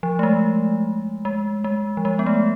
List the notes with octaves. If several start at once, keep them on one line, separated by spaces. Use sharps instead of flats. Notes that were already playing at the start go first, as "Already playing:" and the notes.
F3
A3
G#3
G#3
G#3
F3
G#3
B3
A3